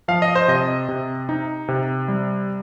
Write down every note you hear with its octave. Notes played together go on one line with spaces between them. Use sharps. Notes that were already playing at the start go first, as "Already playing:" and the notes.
F3 F5
D#5
C5
C3 D#5
C3
D#4
C3
G3